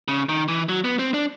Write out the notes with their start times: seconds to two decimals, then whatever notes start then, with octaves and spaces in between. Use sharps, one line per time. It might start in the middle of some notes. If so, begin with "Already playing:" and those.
0.08 C#3
0.29 D#3
0.48 E3
0.69 F#3
0.84 B3
0.99 C4
1.14 D4